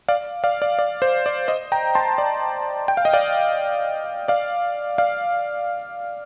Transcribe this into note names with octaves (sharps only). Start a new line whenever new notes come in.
D5 F5
D5 F5
D5
D5
C5
D5
C5 D#5
G5 A#5
A5 C6
D5
G5
F5
D#5
D5 F5
D5 F5
D5 F5